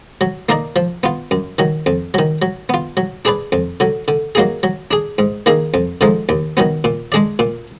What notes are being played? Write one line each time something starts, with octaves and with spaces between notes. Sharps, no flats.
F#3
A#3 D#4 A#4 D5
F3
B3 F4
F#2
D#3 F#3
F2
D#3 F#3
F#3
B3 F4
F#3
D4 G#4 B4 D5
F2
D3 F#3
D3
F#3 A#3 D#4 G#4
F#3
D4 G#4
G#2
D#3 A#3 D#4 G#4
F2
D3 F3 G#3 D#4
D#2
D#3 F#3 B3
A#2
G#3 D4 G#4 D5
A#2